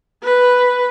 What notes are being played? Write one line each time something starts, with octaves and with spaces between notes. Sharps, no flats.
B4